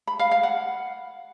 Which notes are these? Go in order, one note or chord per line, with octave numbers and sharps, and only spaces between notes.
B5
F5
F5
F#5